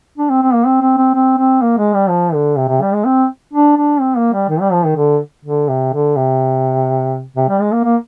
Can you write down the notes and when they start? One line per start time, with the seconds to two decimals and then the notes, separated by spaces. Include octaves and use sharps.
0.18 D4
0.30 C4
0.42 C4
0.53 A#3
0.66 C4
0.81 C4
0.97 C4
1.14 C4
1.38 C4
1.62 A#3
1.78 G#3
1.94 G3
2.09 F3
2.33 D3
2.58 C3
2.69 C3
2.82 G3
2.93 G#3
3.05 C4
3.53 D4
3.77 D4
4.01 C4
4.17 A#3
4.33 G3
4.49 D#3
4.61 G3
4.73 F3
4.85 D#3
4.96 D3
5.45 D3
5.69 C3
5.93 D3
6.16 C3
7.37 C3
7.49 G3
7.61 G#3
7.72 A#3
7.84 A#3